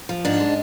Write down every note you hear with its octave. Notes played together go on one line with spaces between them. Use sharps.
F3
G#2 D4
G#3